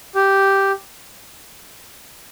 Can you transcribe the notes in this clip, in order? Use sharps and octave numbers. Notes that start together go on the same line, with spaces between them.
G4